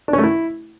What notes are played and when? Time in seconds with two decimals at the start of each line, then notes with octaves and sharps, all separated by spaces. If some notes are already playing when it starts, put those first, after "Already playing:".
0.08 D4
0.13 C#4
0.18 A3
0.23 E4